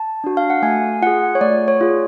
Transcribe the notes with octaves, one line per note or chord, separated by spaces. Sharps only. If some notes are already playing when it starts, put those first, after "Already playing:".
Already playing: A5
D4 F#4
F5
F#5
A3 G#5
F4 G#4 F#5
C#5
A3 D5
C#5
F4 G#4